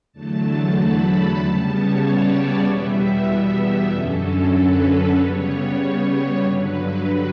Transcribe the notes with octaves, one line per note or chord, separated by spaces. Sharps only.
E2 D3 F#3 A3 A5
B5
C#3 G3 B3 A5
C#5
D5
D5
E2 B2 G3 B3 E5
F#2 D3 F#3 C#4 A4
B4
C#3 G3 B3 C#5
G2 D3 F#3 B4